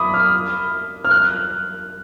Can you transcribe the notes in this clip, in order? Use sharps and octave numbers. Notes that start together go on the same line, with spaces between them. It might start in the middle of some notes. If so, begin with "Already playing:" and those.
Already playing: B5 D6 D#6
F6
F6
F#6